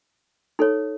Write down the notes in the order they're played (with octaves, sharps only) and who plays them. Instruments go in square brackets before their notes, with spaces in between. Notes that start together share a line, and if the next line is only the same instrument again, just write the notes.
[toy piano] D#4 A4 C#5